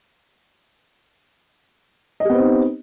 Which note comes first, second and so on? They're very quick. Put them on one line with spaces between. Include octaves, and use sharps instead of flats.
D#5 G4 B3 C4 D#4